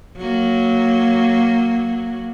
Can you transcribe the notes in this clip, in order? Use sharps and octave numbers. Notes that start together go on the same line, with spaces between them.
F#3 A#3